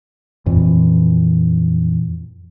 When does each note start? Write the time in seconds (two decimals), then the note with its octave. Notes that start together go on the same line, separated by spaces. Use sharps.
0.46 F2 A#2 E3